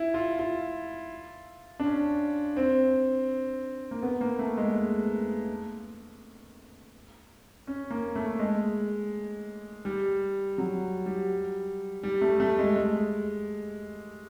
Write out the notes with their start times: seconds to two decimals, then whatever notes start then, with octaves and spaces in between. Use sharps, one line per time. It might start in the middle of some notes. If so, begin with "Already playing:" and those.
Already playing: E4
0.14 F4
0.39 F4
1.80 D4
1.85 C#4
2.57 C4
3.91 A#3
4.03 B3
4.21 A#3
4.39 A3
4.57 G#3
7.67 C#4
7.90 A#3
8.16 A3
8.39 G#3
9.85 G3
10.58 F#3
11.06 G3
12.03 G3
12.21 A3
12.40 A3
12.59 G#3
12.76 G#3